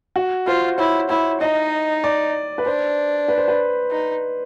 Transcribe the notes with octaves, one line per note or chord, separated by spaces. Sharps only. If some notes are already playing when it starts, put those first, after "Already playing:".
F#4
F4 C5
E4 C#5
E4 C#5
D#4 D#5
D5
B4
D4 C5
B4
C5
B4
D#4